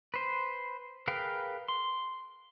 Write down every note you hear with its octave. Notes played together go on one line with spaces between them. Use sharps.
B4 C5
G#4 A#4 B4 F5 G5
C6